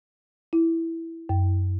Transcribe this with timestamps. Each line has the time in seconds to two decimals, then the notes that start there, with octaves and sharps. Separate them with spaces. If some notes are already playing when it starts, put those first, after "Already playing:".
0.53 E4
1.29 F#2